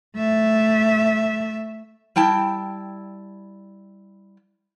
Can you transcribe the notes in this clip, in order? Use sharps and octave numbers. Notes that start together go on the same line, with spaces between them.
A3 E5
G3 E4 G5 A5